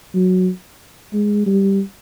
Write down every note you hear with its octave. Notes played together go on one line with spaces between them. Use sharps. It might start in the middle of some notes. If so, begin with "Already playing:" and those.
F#3
G#3
G3